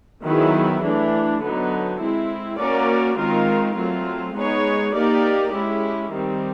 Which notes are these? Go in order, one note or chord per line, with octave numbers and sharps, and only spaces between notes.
D#3 F#3 B3 E4 G#4
E3 A3 D4
D3 F#3 B3 D#4
G#3 C4 E4
A#3 C#4 F#4 A#4 D5
D#3 G#3 C4 F4 A#4
F#3 A3 C4 F4
G#3 B3 D#4 G#4 C#5
A#3 D#4 G4 A#4 D5
G#3 C#4 E4 G4
D#3 G3 C4